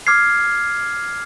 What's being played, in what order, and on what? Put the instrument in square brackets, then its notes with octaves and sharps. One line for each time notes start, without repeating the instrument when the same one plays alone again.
[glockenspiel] D6 F6 G#6 C7